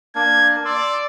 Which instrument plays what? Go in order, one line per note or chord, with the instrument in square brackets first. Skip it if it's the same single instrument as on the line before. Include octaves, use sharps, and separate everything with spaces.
[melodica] A#3 D4 [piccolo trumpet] G#6
[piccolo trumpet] D5 [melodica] C6 E6